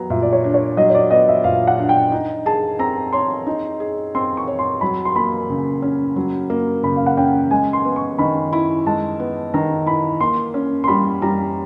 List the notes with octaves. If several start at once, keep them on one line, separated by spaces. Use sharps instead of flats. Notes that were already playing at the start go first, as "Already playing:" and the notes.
Already playing: F#3 B3 A#5
A#2 E5
D5
C#5
D4
C#5
F#3 D#5
C#5
D5
B3 D#5
E5
A#2 F5
F#5
D4
G5
D#4
G#4 A5
C4 A#5
C#5 C6
D#4
G#4
C4 C6
C#6
C#5
C6
F#3 B5
C6
A#3 B5
C#3
C#4
F#3
A#3
C#3 B5
F5
F#5
C#4 G5
G#3 G#5
C6
B3
C#6
D#3 B5
E4 B5
G#3 A5
B3
D#3 A#5
E4 B5
A#3 C6
C#4
C6
G3 B5
G3 A#5